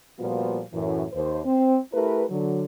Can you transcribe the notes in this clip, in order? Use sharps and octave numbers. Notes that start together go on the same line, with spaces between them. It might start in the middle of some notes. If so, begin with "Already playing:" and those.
A#2 F3 G3 B3 F4 F#4
F#2 A2 E3
D#2 C5
C4
A3 E4 G4 A#4 B4
D3 F#3